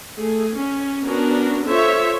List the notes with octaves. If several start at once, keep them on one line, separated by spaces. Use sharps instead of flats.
A3 G#4
C#4
B3 C#4 D4 F#4 A#4
F4 A4 C5 C#5 E5